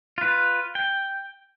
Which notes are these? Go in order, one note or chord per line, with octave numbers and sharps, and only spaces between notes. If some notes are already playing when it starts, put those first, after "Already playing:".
F4 B4
G5